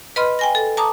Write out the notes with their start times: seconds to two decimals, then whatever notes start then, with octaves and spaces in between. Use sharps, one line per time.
0.16 B4 D#5 B5 C6 F6
0.39 G5 G#5 A#6
0.55 A4
0.77 A5 A#5 D6 D#6